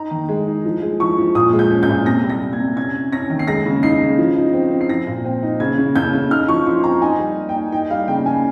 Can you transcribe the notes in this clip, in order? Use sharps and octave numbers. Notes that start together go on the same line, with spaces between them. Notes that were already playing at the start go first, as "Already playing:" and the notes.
Already playing: D#4 A#5
D#3
G#3
D#4
F3
G#3
F3 C#6
F3
A#2 D#6
G#3
G6
C#4
G6
A#2
C3 A#6
G3
A#6
C3
G#6
C3
C#4 G#6
C#4
C#4 A#6
D#3
C7
G#3 A#6
C#3
D#4 C7
C#3
F3
D#4
C4
C4
C7
F3 A#6
A#2
C4
D#4
C#3 G#6
C#3
C#3 G6
C#3
D#4 F6
F3 C#6
F3 C6
C4 A#5
D#4 G#5
G3
A#3
G5
D#4
D#4 G5
G3 F5
C#3 G5
C#3 G#5